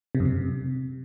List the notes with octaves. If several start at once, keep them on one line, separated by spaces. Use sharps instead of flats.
C3
F#2
C3